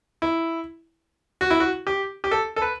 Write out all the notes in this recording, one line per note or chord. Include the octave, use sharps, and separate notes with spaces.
E4
F#4
E4
F#4
G4
G4
A4
A4
B4